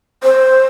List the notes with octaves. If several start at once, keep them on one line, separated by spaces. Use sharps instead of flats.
C5